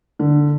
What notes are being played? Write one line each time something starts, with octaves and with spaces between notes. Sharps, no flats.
D3